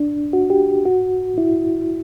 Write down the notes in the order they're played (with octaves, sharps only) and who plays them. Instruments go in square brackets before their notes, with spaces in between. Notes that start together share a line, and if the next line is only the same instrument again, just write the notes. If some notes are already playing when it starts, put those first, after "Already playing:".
Already playing: [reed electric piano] D4
F#4
G4
F#4
E4